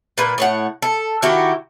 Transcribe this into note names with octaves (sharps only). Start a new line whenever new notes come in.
A#2 B4
A2 C#5 F#5
A4
D#3 E4 F#4 G4